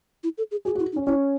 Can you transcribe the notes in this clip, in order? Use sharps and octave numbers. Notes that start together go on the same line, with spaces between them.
E4
A4
G#4
F#4 G#4
F#4
E4
D#4
C#4
C#4 E4